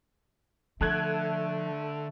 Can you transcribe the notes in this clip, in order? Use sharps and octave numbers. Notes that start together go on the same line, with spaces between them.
D3 F3 A3 A4 F#6 G#6